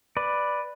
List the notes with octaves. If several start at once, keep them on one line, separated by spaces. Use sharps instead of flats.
B4 D5